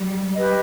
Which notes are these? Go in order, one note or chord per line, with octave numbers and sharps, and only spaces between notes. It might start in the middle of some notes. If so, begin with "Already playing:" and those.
Already playing: G3
G4 B4 D#5